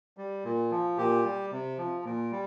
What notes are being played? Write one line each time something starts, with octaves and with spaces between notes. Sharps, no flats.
G3
A#2
F3
A#2 G4
G3
C3
F3
A#2
G3